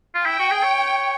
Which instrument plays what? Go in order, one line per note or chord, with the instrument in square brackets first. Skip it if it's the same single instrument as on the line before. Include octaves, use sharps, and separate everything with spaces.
[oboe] F4
[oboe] E4 [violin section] G5
[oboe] F#4
G#4
C#5